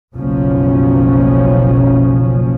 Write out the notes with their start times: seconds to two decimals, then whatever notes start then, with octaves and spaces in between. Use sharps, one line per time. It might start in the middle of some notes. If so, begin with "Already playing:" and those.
0.15 F#1 B1 F3 C#4